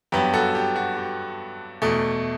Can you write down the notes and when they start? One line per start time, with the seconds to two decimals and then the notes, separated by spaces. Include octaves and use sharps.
0.12 G2 F#3 B3 G4
0.33 F#4 A4
0.55 G4
0.76 F#4
0.97 G4
1.82 E2 B2 A3